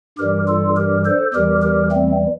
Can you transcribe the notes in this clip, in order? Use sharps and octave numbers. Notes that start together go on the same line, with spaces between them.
G2 E3 G3 G4 A#4
F4 A4
G4 A#4
A4 C5
E2 E3 G3 G4 A#4
G4 A#4
A3 C4